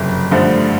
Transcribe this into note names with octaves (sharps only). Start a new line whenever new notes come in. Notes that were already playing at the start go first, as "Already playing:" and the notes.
Already playing: F#1 F2 C3
G2 D3 F3 A3